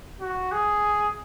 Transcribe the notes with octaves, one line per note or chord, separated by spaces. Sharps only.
F#4
G#4